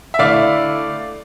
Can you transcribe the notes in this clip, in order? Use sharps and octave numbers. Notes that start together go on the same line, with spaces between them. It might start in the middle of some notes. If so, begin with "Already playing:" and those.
E5
D3 A3 E4 D5 F5